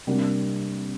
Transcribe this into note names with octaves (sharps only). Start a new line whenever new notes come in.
C3 G3 A#3 D4